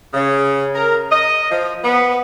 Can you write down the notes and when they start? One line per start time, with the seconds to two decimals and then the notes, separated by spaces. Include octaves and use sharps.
0.14 C#3
0.74 A#4
1.10 D#5
1.51 F3
1.84 B3